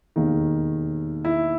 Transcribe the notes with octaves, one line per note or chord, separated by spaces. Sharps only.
E1 D#2 D#3
E4